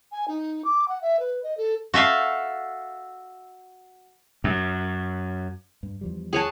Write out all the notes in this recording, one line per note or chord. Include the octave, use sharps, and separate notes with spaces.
G#5
D#4
D6
F#5
E5
B4
D#5
A4
F#4 A4 E5 F5
F#2
G2
E2 F3 G3
G#4 C#5 F#5 G#5 A5